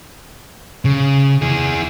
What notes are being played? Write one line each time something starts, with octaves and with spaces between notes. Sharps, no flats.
C#3
E4 G#4